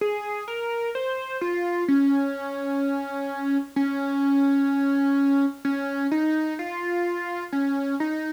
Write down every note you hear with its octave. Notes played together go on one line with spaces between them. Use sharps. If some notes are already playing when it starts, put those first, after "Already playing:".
G#4
A#4
C5
F4
C#4
C#4
C#4
D#4
F4
C#4
D#4